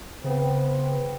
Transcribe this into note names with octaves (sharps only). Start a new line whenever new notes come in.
C#3 B3 C4